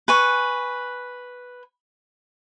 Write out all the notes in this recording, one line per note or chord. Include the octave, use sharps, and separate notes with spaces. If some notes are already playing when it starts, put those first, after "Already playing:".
B4 G#5 C#6